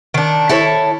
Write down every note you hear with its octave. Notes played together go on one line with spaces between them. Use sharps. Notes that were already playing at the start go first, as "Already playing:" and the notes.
D#3 D4
E4 A4 B4 C#5